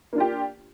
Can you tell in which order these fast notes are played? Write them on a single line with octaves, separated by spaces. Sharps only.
A#3 D4 F4 G4